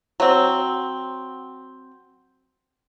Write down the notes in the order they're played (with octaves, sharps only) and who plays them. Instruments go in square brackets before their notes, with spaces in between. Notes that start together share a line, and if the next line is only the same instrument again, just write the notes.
[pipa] F#3 C4